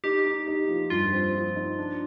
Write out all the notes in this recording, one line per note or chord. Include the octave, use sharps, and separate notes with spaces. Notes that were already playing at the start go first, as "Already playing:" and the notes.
D#4 G4
D#4
D#4
F3
G2 F4
C4
F3
D#4
D4